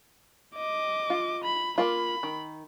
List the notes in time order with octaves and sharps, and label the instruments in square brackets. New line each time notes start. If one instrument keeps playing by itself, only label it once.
[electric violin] D#5 D6
[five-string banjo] F4
[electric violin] B5
[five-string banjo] A#3 F4 [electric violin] B5
[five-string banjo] D#3